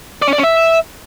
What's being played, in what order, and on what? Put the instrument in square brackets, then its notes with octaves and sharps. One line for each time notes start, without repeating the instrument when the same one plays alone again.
[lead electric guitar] D5
C#4
D5
C#4
E5